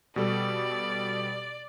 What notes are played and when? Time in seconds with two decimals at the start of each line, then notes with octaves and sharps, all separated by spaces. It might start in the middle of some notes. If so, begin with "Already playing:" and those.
0.16 B2 G3 A4 D5